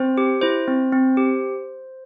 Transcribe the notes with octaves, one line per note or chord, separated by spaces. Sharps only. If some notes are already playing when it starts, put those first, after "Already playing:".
Already playing: C4 C5
G4
E4 C5
C4
C4
G4